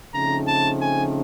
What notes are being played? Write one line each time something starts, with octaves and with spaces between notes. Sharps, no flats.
C#3 F3 A3 C4 D#4 A#5
A5
G#5